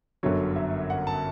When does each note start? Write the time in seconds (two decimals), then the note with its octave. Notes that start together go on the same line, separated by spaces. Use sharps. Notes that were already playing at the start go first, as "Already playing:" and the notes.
0.23 G1 F#2 D3 F#3 C#5
0.56 E5
0.90 F#5
1.07 A5